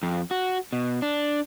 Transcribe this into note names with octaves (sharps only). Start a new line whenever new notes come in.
F2
F#4
B2
D4